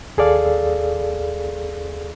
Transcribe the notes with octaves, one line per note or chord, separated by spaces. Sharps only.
D#2 G#4 A4 D5 F5